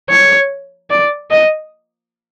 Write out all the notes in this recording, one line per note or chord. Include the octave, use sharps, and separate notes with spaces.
C#5
D5
D#5